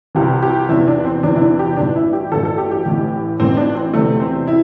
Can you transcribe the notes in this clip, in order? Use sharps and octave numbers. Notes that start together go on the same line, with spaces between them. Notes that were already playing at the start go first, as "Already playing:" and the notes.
C2 C3 E3 G4
G4
E2 C3 E3 E4
D4
C4
E2 C3 E3 D4
E4
D4
G4
A1 G2 E3 D4
E4
G4
A1 G2 E3 A4
A4
G4
G4
A1 A2 E3
A1 A2 E3 C4
D4
C4
E2 C3 E3 A3
C4
E4